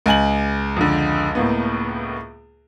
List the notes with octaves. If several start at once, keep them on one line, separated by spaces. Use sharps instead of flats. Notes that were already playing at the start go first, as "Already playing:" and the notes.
C#2 G#5 F#7
F2 D3
A2 A#3 B3